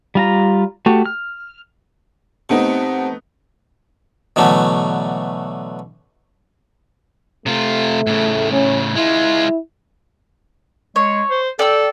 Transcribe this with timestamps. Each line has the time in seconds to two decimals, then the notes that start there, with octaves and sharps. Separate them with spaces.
0.15 G3 F4 A#5
0.86 A3 F#4 G4
1.06 F6
2.49 C3 A3 B3 D#4
4.36 B2 D3 E3 F#3 A3
7.46 C3 A3 F4
8.07 A2 C#3
8.52 C#4
8.96 G#3 E4 F4
10.96 G#3 C#5
11.30 C5
11.59 A4 D5 G5 E6